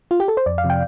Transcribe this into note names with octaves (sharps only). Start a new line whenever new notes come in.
F4
G4
A4
C5
F2 D5
F5
C3 F3
G5